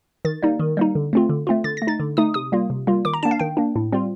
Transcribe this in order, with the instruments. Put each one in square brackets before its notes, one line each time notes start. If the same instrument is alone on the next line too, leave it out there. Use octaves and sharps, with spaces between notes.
[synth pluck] D#3 A6
G3 A#3 D#4
D#3
G3 A#3 D#4
D3
A3 C4 F4
D3
A3 C4 F4
D3 A6
A3 A#6
D#4 A6
D3
A3 D#4 D#6
C3 D#6
G3 A#3 F4
C3
G3 A#3 F4
D#3 D6
A#5
A#3 D4 A5
F5
D#3 G5
A#3 D4
A2
G3 C4 F4